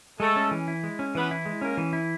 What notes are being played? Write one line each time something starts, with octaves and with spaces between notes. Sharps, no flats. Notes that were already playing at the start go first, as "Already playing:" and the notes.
G#3 A3 A4
C#4
E3
E4
G#3
C#4
E3 B3 B4
E4
G#3
A#3 C#4 A#4
E3
E4